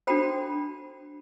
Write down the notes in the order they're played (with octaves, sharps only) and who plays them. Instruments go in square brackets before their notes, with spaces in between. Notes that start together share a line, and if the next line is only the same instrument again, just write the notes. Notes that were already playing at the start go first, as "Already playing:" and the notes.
[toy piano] D4 F#4 A4 C5 G5 B5